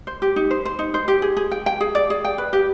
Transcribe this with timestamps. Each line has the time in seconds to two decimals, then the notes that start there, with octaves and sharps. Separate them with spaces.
0.07 C5
0.22 G4
0.36 D#4
0.51 C5
0.65 C5
0.79 D#4
0.94 C5
1.08 G4
1.22 G#4
1.37 G#4
1.51 G5
1.66 G5
1.81 G#4
1.95 D5
2.10 G#4
2.24 G5
2.38 B4
2.53 G4